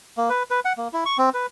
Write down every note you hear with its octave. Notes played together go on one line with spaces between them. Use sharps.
A#3
B4
B4
F#5
A#3
E4
C#6
C4
B4